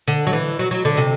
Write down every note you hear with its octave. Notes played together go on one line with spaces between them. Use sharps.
D3
F#3
E3
F#3
F#3
D3
C3